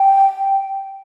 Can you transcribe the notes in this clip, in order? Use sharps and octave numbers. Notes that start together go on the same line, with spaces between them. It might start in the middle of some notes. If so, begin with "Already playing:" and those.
Already playing: G5